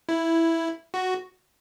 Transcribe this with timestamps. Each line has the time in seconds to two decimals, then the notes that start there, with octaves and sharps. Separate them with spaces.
0.09 E4
0.94 F#4